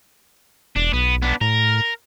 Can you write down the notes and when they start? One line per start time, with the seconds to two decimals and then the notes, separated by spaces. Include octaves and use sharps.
0.76 E1 D4
0.93 B1 B3
1.22 B3 D4
1.41 A2 A#4